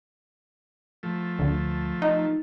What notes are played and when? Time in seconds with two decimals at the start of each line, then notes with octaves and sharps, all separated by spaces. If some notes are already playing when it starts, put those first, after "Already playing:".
1.03 F3 A3
1.39 D2
2.02 D#4